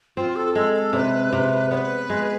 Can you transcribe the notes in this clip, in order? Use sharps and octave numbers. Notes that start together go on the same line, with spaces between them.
C4 F4
A4
G#3 A4
A4
C3 B4 D5
C3
B3 B4 D5
G#3